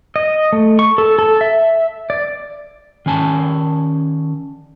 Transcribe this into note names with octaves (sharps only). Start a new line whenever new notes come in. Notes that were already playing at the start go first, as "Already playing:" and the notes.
D#5
A3
C#6
A4
A4
E5
D5
D#3 C#4 G#5 A5